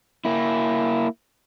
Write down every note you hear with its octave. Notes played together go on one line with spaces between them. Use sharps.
A#3 E4